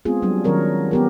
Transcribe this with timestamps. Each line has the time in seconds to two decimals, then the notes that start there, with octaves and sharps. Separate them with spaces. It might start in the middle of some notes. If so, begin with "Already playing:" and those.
0.05 G#3 B3 C4 F4 G#4
0.22 F#3 G3 D4
0.44 D#3 F#3 C#4 A#4 C#5
0.91 B3 G4 A#4